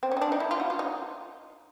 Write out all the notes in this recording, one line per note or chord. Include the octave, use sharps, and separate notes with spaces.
C4
C#4
D#4
D4
D#4
E4
F4
F#4
F4
D#4